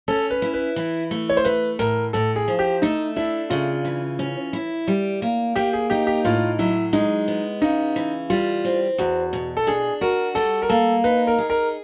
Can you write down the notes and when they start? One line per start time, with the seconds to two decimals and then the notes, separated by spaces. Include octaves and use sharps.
0.08 C#4 A4
0.30 B4
0.42 E4
0.54 B4
0.76 E3
1.11 A3
1.29 C#5
1.37 C5
1.45 A3 B4
1.79 A2 A#4
2.13 A2 A4
2.36 G#4
2.48 F3
2.59 G4
2.82 A3 D#4
3.16 D4 E4
3.50 C#3 F4
3.85 E3
4.19 C#4
4.53 E4
4.88 G3
5.22 A#3
5.56 A#3 G4
5.73 G#4
5.90 D#4 G4
6.07 G4
6.25 A2 F4
6.59 F#3 E4
6.93 G#3 D#4
7.28 B3
7.62 C#3 D#4
7.96 E3
8.30 G3 F4
8.65 C4
8.98 E2 F#4
9.33 B2
9.57 A4
9.67 D4 G#4
10.01 F#4 A#4
10.35 G3 A4
10.62 A#4
10.69 A#3 A4
11.04 D#4 B4
11.27 A#4
11.39 G#4
11.50 A#4